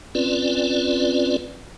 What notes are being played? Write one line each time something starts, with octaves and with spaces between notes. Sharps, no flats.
C4 C#4 F4 B4 D5